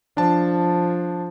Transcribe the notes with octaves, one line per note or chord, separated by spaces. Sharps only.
F3 D4 A5